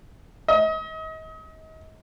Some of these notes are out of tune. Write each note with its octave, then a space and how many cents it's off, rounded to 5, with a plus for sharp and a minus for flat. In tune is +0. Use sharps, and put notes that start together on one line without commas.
D#5 +35